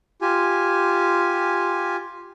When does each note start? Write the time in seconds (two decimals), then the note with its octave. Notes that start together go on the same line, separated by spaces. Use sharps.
0.22 F4 G4 G#5